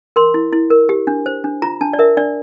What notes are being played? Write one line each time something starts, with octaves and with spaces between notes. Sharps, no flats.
A#4 C6
E4
E4
A#4
G4
D4
C5
D4
F4 A#5
D4 A5
D5
A#4 E5
D4 D5